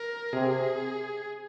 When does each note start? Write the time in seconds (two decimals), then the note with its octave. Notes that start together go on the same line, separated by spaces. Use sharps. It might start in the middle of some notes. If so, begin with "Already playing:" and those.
Already playing: A#4
0.33 C3 G#4